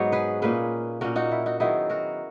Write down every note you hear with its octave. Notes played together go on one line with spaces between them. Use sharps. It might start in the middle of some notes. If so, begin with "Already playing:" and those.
Already playing: G#2 F#3 B3 D#4 C#5
G#4 B4
A#2 A#3 C#4 G#4 B4
A#2 A#3 C#4 F#4 A#4
D#4 F#4
E4
D#4 F#4
D#3 F#3 B3 D#4 E4 G#4
F#4 A#4